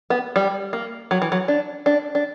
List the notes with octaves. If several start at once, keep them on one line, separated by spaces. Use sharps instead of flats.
B3
G3
A#3
F#3
E3
F#3
D4
D4
D4